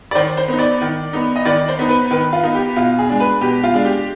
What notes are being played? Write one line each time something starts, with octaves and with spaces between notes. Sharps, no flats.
D5
D#3 C5
C5
B3 D#4
D5
D#3
B3 D#4
D#5
D#3 D5
C5
B3 D#4
B4
D#3 B4
F4
B3 D#4
G4
B2 F4
G#4
G#3 D4
B4
B2 G4
F4
G#3 D4
G4